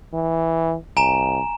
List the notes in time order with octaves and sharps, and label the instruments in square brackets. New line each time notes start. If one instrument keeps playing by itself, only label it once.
[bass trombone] E3
[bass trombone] C2 [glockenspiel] G#5 A#5 E7